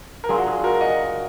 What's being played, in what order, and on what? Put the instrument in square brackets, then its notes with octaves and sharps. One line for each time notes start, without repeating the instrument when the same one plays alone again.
[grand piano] A#4
[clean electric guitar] F#3 D4 F4 [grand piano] G#4
[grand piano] F#4
G#4
F#4 A#4
D#5 F#5